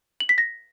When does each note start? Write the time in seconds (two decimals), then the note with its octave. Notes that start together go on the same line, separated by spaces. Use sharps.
0.20 F#7
0.29 B6
0.38 A#6